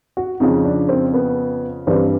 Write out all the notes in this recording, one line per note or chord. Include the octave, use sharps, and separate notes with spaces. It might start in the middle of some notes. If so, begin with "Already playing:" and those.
F#4
F2 C#3 F3 D#4
D4
C4
B3
G2 E3 G3 C4